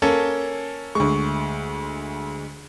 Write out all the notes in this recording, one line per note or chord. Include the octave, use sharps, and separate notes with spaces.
A#3 C#4 A4
D2 G#3 C#6